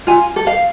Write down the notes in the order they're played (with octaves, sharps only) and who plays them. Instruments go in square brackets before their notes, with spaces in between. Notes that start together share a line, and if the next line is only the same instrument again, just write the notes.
[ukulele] F4 G#5
A4
F5